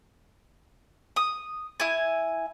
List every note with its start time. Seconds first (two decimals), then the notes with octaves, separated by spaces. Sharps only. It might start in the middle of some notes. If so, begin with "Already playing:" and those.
1.16 D#6
1.80 E4 G#5